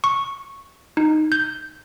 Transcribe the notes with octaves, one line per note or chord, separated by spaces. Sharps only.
C#6
D#4
G6